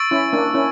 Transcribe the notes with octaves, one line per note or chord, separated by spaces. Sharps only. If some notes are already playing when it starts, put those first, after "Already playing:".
Already playing: C#6 E6 A6 D7
C#4 E4
A#3 D4
C#4 E4